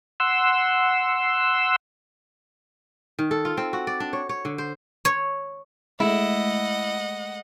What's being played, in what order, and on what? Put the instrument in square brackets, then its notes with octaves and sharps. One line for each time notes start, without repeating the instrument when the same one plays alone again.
[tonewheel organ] F#5 C6 E6
[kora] D#3
A4
F4
C4
F#4
D5
D4
C#5
C#5
D3
C5
[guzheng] C#5
[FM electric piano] G#3 A3 [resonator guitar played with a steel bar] E4 [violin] D#5 F#5